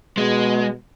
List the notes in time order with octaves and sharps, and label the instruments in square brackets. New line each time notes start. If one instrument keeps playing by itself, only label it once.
[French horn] B2 [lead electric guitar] G#3